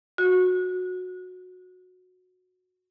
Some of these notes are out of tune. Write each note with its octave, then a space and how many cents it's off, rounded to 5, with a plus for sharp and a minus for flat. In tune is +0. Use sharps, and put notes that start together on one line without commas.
F#4 -15